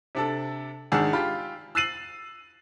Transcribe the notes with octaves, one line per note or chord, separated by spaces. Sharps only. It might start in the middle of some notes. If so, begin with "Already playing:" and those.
C3 D4 A4
G#1 D#3 D4 G#4 F#5 E6
F4 G4 G5 B5
E6 F#6 A6 C7 D#7 F#7